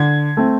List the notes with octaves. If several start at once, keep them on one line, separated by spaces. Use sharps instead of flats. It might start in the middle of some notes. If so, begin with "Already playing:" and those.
Already playing: D3 G#6
A3 C4